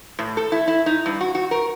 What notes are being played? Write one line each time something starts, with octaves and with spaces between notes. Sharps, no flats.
A2
A4
E4
E4
D#4
G2
F#4
F#4
A#4